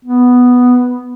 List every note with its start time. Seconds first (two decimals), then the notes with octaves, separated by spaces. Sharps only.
0.05 B3